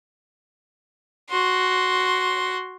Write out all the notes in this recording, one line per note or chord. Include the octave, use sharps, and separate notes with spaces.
F#4 C6